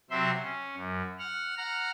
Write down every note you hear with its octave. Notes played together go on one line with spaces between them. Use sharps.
C3 F#3 C4 E5 C6
C#4
F#2
F#5 F6
F#5 A#5 F6